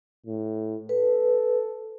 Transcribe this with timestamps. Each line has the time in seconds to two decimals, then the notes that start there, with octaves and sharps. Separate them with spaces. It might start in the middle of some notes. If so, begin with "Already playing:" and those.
0.26 A2
0.89 A4 B4